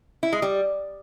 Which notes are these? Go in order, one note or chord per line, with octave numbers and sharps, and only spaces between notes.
E4
G#3
G3